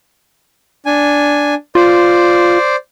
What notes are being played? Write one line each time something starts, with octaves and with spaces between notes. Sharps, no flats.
D4 G#5
F4 C5 D5